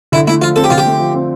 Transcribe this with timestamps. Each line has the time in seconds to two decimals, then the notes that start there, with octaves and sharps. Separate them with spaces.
0.12 D3 E4
0.27 A3 E4
0.41 F3 F4
0.56 C4 A4
0.64 G4
0.70 D3 F4
0.78 G4
0.86 A3
1.00 F3
1.14 C4